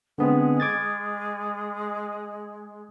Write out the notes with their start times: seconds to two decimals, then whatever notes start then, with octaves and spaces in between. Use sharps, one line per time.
0.18 D3 G#3 B3 C4
0.60 D6 G#6 A6